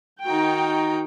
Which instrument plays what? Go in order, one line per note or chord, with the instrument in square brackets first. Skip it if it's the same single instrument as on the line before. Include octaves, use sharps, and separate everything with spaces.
[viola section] D#3 D#4 F#4 G5